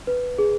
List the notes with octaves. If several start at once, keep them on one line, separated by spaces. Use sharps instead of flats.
B4
G#4